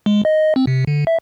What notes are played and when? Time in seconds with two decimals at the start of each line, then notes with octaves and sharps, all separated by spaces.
0.06 G#3
0.25 D#5
0.56 C4
0.67 C3
0.87 D3
1.07 E5